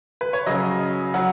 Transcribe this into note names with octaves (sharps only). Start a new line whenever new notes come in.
B4
C#5
C#3 F#3 D#5
F#3 F#5